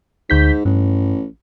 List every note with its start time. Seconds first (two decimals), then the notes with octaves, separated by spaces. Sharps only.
0.30 D2 G#2 G6 B6
0.65 A1 G2